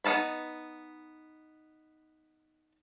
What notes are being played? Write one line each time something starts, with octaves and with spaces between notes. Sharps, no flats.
B3 D#4 F5 A5 B5